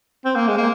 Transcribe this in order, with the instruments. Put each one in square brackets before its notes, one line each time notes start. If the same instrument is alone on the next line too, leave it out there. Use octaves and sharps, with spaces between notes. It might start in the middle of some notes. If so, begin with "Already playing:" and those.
[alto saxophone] C4
A#3
G#3
A#3